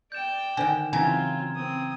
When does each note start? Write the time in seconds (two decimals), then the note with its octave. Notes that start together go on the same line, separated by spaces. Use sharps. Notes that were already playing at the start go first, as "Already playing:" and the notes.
0.12 D5 G5 G6 E7
0.57 D3 D#3 C5 G#5
0.93 C#3 E3 F#3 C4 F4 G#5 A#5 G#6
1.55 C4 D#6